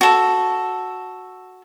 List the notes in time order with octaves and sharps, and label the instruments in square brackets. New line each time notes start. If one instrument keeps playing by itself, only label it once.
[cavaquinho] F#4 A4